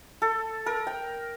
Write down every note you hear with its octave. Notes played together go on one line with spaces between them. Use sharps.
A4
A#4
G5